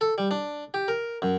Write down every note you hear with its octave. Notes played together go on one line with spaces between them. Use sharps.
A4
G3
D4
G4
A#4
F#2